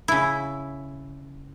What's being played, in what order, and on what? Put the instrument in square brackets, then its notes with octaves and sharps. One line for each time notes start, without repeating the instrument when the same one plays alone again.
[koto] C#3 E4